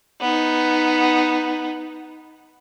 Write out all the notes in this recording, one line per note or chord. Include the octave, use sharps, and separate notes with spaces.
B3 D#4